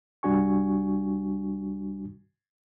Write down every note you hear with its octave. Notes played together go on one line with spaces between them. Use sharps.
C2 G3 D4 F#4 G#5 C#6